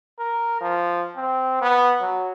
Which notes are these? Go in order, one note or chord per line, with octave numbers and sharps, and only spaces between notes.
A#4
F3
C4
B3
F#3